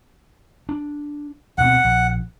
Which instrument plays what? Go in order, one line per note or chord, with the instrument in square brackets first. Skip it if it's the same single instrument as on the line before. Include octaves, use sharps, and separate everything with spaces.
[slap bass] D4
[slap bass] D2 B2 C4 [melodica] F#5
[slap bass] A#1